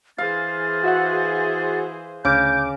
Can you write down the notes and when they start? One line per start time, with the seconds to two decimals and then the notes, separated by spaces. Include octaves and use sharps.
0.18 E3 G#4 C5 F5 A6
0.83 F#4 E5 F#5
2.25 D2 C#3 D6 G6